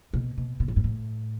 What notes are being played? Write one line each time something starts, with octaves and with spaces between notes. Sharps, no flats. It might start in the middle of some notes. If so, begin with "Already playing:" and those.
B2
B2
B2
A2
G#2
A2